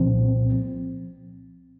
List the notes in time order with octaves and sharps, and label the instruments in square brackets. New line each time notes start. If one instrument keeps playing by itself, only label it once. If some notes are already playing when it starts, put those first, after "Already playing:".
Already playing: [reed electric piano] C2 A#2 F3 C4